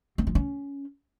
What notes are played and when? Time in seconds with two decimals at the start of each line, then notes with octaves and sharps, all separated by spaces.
0.18 C4
0.27 F3
0.35 C#4